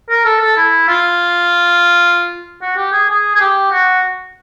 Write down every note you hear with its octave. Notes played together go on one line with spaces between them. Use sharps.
A#4
A4
A4
E4
F4
F#4
G4
G#4
G#4
G#4
G4
F#4